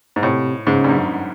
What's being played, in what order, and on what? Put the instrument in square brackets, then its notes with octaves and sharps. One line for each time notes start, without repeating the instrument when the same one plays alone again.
[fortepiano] G#2
[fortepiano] A2 [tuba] C3
[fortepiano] G#2 [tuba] C#3
[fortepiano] G2
F#2